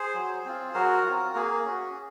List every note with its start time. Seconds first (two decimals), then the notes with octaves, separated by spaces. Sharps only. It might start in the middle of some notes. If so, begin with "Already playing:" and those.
Already playing: G#4 C5
0.15 F#3
0.45 C4 F4
0.74 F#3 F#4 A#4
1.05 C4 F4
1.35 A#3 G#4
1.65 C#4 F#4